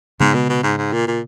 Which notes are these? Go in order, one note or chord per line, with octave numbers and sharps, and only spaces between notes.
G#2 C#3 G#3 B3
B2
B2
G#2
G#2
A#2
A#2